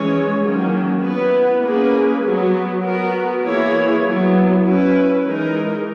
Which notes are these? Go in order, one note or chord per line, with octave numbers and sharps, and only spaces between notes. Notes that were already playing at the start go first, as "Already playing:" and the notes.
Already playing: E3 G#3 C#4 G#4 C#5
D#3 F#3 A#3 C#4
B3 E4 B4
A#3 C#4 G#4 B4
F#3 B3 F#4
B3 F#4 A#4
E3 A#3 E4 G#4 C#5
F#3 B3 E4
C#4 E4 B4
E3 G#3 D#4 A#4